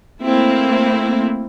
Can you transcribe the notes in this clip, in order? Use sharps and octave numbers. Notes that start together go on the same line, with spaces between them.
A3 A#3 C4 E4